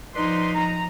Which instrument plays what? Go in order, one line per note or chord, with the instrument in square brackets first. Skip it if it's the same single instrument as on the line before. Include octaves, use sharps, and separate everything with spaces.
[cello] F3 D#4 [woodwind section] B4 D5 C6
[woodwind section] A#5